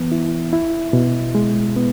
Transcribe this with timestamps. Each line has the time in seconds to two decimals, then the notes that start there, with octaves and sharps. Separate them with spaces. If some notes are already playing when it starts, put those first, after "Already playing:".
Already playing: E3 B3
0.12 E4
0.53 E4
0.93 B2
1.35 G#3
1.76 B3